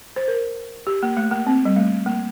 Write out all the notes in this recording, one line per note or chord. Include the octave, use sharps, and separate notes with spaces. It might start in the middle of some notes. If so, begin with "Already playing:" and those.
C5
A#4
G4
A#3
A3
A#3
C4
G3
A3
A#3